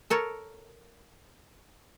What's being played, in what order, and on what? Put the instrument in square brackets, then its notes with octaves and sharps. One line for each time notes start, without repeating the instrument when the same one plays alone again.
[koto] A4 A#4 C#5